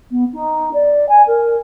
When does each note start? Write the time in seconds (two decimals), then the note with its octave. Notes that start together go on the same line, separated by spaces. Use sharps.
0.11 B3
0.33 D#4
0.74 D5
1.09 G#5
1.27 A#4